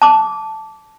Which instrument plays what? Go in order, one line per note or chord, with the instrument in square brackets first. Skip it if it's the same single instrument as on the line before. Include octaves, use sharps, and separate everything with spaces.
[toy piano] A5 D6